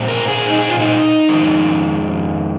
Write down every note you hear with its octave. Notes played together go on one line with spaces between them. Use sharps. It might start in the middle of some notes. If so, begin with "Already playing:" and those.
Already playing: A#2 G#3 C4
A#4
G#4
D#4
G#4
F4
D#4
F2 D#3 G#3